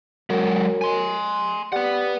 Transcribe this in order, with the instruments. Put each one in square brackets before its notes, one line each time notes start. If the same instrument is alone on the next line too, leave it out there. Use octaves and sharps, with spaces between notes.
[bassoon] F#2 [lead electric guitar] F#3 G#3
[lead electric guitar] G#5 C6
[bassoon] G3 [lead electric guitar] B4 F#5